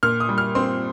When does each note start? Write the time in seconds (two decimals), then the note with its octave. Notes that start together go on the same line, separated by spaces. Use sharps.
0.03 A#2 F6
0.20 D#6
0.29 G3
0.38 F6
0.55 C4 C6